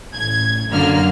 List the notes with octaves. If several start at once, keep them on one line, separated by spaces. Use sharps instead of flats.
A1 G#6
F#2 D3 A#3 F6